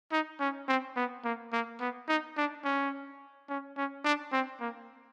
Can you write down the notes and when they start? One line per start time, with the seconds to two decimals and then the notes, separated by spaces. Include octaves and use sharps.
0.12 D#4
0.40 C#4
0.68 C4
0.96 B3
1.24 A#3
1.52 A#3
1.80 B3
2.08 D#4
2.37 D4
2.64 C#4
3.49 C#4
3.77 C#4
4.04 D4
4.32 C4
4.60 A#3